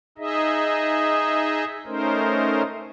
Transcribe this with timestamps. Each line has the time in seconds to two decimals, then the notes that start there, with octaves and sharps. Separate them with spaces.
0.18 D#4 G#4 D#5 E5
1.86 A3 C#4 D#4 A#4 C5